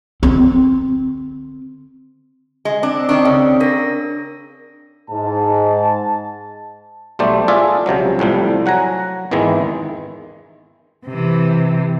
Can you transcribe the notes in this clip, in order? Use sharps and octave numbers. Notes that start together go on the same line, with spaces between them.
D3 C4
G#3
C4 D4
D#3 D4 C#6
C#3
D4 A#4 A#6
G#2 A5
B1 G3 A3 C5 D5
F4 G#4 A4 D5 E5
C#2 C3 F3 F#3
C2 A2 F3 G3
F#3 F#5 G#5 A#5
G#1 E2 D#3 E3 G#3 E4
C3 E3